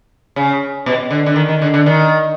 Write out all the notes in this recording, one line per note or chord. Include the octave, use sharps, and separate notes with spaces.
C#3
B2
D3
D3
D#3
D#3
D3
D3
D#3